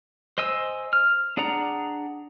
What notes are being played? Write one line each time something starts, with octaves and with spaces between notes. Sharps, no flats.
C5 D#5 G#5 E6
F6
D4 G#4 D5 F#5 A#5